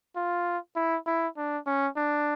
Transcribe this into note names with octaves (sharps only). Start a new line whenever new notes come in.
F4
E4
E4
D4
C#4
D4